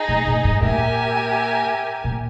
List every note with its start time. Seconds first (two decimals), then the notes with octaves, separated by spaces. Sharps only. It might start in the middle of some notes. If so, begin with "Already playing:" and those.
Already playing: D#4 G#4 D#5
0.08 A#2
0.26 A#2
0.44 G#2
0.62 A#2 G4 A#4 E5 G#5
2.04 A#2